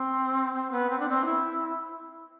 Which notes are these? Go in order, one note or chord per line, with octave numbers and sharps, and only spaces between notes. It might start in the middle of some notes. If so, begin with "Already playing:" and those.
Already playing: C4
C4
B3
C4
D4
C4
E4